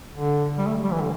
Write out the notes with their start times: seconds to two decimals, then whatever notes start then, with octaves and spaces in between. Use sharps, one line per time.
0.13 D3
0.58 G3
0.67 A3
0.84 G3
0.92 E3
1.01 D3